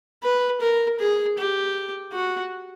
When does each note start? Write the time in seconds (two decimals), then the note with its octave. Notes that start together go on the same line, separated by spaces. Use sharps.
0.24 B4
0.61 A#4
1.00 G#4
1.38 G4
2.13 F#4